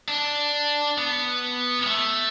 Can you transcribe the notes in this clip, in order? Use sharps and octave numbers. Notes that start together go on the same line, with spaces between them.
D4
B3
A3